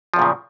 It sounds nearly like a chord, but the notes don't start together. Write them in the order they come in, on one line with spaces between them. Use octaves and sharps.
F3 E2 A#2 C#3